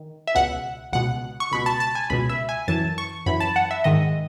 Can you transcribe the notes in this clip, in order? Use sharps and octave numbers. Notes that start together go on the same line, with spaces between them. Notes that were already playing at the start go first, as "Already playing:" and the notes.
Already playing: D#3
E5
C#2 B2 F#5
C#2 B2 F#5
C#6
C#2 B2 B5
A5
A5
G#5
C#2 B2 B5
E5
G#5
F#2 E3 A5
C#6
F#2 E3 B5
A5
F#5
E5
G#2 D#3 D#5